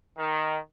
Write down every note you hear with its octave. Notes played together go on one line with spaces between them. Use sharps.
D#3